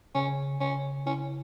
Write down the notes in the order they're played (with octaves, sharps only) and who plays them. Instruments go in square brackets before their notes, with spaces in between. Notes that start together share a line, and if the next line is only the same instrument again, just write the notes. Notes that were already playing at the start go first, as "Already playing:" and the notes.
[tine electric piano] C#3 [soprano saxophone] C#4
[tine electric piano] C#3 [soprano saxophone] C#4
[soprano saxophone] C#4 [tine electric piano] E4